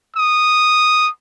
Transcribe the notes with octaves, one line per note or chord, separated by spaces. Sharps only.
D#6